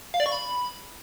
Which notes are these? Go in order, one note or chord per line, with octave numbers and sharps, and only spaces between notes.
F5
D5
C#6
B5